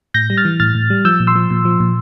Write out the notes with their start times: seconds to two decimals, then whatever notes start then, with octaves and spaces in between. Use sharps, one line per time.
0.14 A2 G6 A#6
0.30 G3
0.37 F6 A6
0.45 E3
0.60 A2 F6 A6
0.75 A2
0.90 G3
1.05 F3 E6 G6
1.20 A#2
1.27 C6 E6
1.35 F3
1.50 A#2
1.65 F3
1.80 A#2